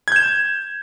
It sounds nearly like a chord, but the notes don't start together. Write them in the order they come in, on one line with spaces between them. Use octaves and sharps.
G#6 G6 E7